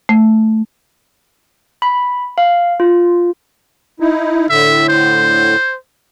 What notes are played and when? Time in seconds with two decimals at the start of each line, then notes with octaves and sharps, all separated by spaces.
0.09 A3
1.82 B5
2.38 F5
2.80 F4
4.00 D#4 E4
4.50 A2 D3 E5
4.89 C5